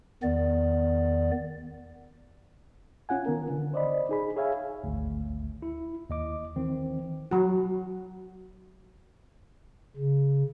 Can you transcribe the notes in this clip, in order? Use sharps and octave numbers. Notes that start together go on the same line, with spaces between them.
E2 D#3 B3 D5
C#4 F4 F#5 G#5
D#3 B3 A#4
D3
C5 D5 D#5 B5
D#4 G#4 B5
G#4 C#5 E5 F5 G#5
G#1 D2
E4
D#2 D#5 D6
D#3 E3 C4
F#3 F#4
C#3